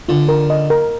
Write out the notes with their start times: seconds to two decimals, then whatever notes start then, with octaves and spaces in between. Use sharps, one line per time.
0.09 D3 F4
0.29 A#4
0.50 D#5
0.70 A#4